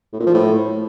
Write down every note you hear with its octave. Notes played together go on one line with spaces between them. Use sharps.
A2
A#2
F3
A2